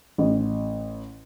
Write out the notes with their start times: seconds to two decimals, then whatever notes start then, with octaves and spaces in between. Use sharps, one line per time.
0.18 A1